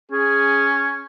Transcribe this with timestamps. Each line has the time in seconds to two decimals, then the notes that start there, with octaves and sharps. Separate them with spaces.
0.11 C#4 G#4